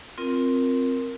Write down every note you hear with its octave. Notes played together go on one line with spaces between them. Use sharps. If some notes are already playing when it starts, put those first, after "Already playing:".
C4 F4 A#4